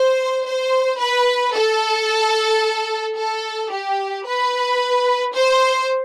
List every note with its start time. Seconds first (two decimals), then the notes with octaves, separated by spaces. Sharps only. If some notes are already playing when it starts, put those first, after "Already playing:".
Already playing: C5
0.45 C5
1.00 B4
1.54 A4
3.17 A4
3.71 G4
4.26 B4
5.34 C5